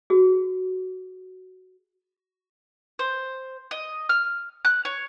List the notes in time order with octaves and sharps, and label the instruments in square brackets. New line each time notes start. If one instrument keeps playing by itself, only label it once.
[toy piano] F#4 G#4
[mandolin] C5
D#5
F6
F#6
C#5